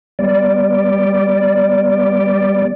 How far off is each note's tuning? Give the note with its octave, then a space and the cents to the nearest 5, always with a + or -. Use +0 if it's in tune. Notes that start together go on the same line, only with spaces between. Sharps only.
G3 +0 B3 -10 D5 +0